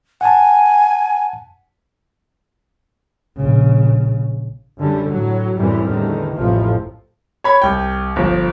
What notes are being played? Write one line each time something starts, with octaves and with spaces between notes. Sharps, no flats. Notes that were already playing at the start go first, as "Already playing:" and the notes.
F#5 G#5 A5
A#1 C#3
F#2 D3 G3
A2 F#3
F#2 A2 C3 E3 G3 C4
E2 A2 D3 D#3
A1 F2 A2 C3 F3
C#5 B5 G#6
C2 G5
G1 F3